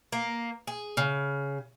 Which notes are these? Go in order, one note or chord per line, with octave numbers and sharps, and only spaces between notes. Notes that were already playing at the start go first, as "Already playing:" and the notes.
A#3
G#4
C#3